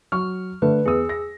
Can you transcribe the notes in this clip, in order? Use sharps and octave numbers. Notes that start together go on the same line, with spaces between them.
F#3 C#6 F6
D3 A3 B4
E2 G#4 D#6 E6
A#6